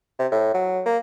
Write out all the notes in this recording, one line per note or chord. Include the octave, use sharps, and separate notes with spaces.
C3
A2
F#3
A#3